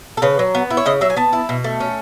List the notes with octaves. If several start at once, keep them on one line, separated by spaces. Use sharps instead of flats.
A4
C#3 B4
F#3
B3
E4
C#5
C#3 D#5
F#3 E5
G#5
B3 A5
E4
B2
A3
C#4